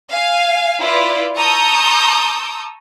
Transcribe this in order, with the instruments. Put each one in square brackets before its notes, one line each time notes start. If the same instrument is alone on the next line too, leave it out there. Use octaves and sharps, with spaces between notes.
[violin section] F5 G#5
E4 F4 B4 D5
A5 A#5 C#6 D#6 E6 G6